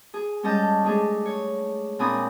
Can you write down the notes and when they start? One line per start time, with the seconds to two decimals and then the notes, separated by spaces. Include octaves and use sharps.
0.14 G#4
0.43 G3 G#3 C#4 D#5 A5 G6
0.84 G#3 A3 D4 G#4
1.26 C#5
1.99 A#2 C4 D4 G#5 B5 D#6